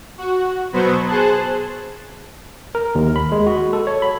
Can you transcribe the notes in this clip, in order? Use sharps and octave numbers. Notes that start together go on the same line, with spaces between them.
F#4
B2 F#3 B3 C5 B5 C#6
G#4 C5 A5 F#6
A#4
D#2
B5
G#3
F#4
A4
C#5
B5